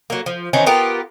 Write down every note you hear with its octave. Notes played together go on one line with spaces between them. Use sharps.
F#3 A#3
F3
D#3 E3 C4 C#4
B3 F4 G4 A#4